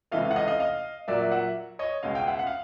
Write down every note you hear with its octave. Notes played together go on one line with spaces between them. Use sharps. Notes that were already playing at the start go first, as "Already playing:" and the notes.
C#2 C3 E3 A3 D#5 F5
F#5
D#5 F5
D#5 F5
D#5 F5
A#2 F#3 A#3 D5 E5
D5 E5
E5 F#5
C#5 D#5
C#2 B2 G#3 D#5 F5
F5 G5
E5 F#5
F#5
F5